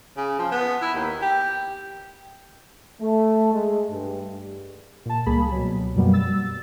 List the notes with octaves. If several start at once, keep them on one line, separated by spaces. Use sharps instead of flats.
C#3
F3
B3
E4
D#2
G4
A3
G#3
G2
A#2 A5
C#2 G3 A#3 G#4 B5
B2 F#3
F#2 B2 F#3 G3 A#3 B3
E6 A6